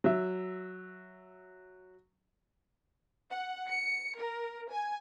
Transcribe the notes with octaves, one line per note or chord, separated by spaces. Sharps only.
F#3 E5
F#5
C#7
A#4
G#5